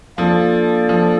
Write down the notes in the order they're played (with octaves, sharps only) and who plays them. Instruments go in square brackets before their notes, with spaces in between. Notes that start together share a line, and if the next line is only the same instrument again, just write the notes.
[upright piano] F3 [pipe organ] A#3 D4 A4 D5
[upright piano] F3